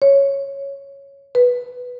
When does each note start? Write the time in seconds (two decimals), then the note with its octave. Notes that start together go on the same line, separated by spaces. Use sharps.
0.02 C#5
1.35 B4